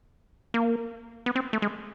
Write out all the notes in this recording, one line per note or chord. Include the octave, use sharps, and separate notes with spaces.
A#3
B3
C4
A3
G#3